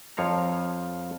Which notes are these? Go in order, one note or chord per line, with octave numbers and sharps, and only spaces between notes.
F2 F3 C#5 F5 A#5